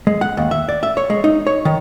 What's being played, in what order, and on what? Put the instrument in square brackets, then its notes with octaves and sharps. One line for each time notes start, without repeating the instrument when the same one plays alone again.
[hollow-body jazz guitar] G#3
F#5
D#2
E5
D5
E5
C#5
G#3
D#4
C#5
D#3